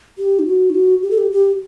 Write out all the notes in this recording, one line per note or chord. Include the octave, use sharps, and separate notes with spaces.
G4
D#4
F#4
D#4
F#4
G4
A4
G4
G4